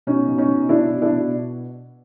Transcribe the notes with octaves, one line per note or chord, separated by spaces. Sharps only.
B2 C#4 D#4
B2
C#4 D#4
B2
B2 D4 E4
B2
D4 E4
B2